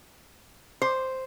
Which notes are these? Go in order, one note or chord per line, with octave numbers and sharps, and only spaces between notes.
C5